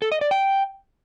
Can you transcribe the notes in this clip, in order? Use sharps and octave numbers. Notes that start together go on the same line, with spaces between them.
A4
D#5
D5
G5